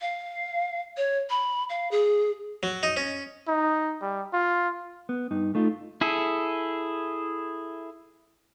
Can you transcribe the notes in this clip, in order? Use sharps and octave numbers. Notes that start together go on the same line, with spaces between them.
F5
C#5
B5
F5
G#4
F#3
D#4
C#4
D#4
G3
F4
B3
G2 D#4
A3 D#4 F4
E4 G#4 A4